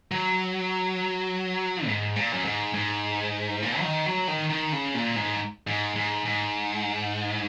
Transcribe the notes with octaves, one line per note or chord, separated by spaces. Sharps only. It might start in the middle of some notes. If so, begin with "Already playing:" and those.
F#3
G#2
A#2
F#2
G#2
G#2
A#2
F#3
D#3
F#3
D#3
D#3
C#3
A#2
G#2
G#2
G#2
G#2